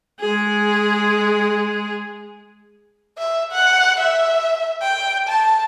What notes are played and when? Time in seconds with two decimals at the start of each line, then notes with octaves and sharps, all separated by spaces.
0.20 G#3 G#4
3.18 E5
3.52 F#5
4.00 E5
4.82 G5
5.28 A5